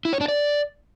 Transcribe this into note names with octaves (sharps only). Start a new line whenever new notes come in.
E4
C#5
D4
D5